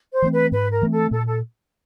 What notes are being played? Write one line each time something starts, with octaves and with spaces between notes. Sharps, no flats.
C5
E3 A3 C4
B4
G#2 B4
A#4
E3 A3 C4
A4
A#2 A4
A4